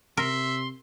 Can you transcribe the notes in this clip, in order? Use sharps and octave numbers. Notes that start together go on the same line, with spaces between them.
C3 A#4 E5 C6